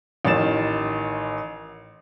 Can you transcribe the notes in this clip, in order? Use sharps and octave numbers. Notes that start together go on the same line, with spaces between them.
A1 D#3 A6 E7